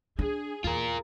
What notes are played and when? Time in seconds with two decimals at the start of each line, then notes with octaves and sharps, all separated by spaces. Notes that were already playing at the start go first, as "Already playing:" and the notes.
0.19 D4 G#4
0.64 E2 F4 A#4